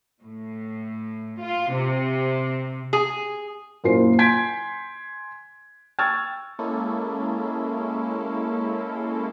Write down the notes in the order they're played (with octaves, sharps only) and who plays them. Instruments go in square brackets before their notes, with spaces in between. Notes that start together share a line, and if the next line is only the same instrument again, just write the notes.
[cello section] A2
F4
C3
[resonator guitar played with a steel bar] G#4
[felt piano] F#2 A#2 E4 F4 C5 C7
G#5 C6 G6 G#6 B6 D7
G5 C#6 E6 F6 G#6 A6
[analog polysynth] G#3 A#3 C#4 E4 A4